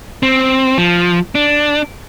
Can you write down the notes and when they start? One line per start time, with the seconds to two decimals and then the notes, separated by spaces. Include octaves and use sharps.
0.23 C4
0.78 F3
1.35 D4